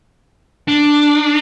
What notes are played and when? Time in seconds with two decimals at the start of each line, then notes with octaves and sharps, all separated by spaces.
0.68 D4